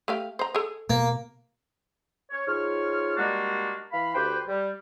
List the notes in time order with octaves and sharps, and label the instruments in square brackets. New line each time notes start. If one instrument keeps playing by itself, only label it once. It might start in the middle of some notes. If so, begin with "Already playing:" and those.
[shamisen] A3 G4 F5
C5 A#5
G#4 A4
[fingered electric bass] B2 [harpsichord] A#3
[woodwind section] C#5
G#2 F4 C#5 F6
G3 G#3 A#3 D4 F#4
E3 F5 B5
D2 G4 B4 C5 G5
G3